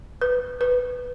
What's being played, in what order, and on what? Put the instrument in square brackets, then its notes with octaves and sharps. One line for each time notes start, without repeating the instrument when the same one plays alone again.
[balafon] B4
B4